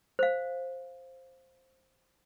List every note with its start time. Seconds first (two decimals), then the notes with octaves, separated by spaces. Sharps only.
0.19 C5 F5